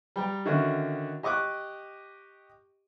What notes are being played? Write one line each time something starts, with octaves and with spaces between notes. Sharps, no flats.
G3 G5 A#5
D3 D#3 C#4 D#4 F#4 E5
G4 D#5 C#6 D6 F#6